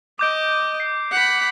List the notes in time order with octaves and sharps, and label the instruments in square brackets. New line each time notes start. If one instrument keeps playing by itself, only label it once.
[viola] D#5 [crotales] D6 G6 D7
[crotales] C7
[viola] F#5 B5